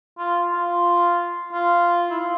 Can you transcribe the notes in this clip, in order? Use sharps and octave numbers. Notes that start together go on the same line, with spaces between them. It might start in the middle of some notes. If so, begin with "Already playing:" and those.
F4
F4
F4
E4
F4